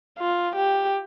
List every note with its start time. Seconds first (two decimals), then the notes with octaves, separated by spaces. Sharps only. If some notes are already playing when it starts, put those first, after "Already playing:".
0.19 F4
0.56 G4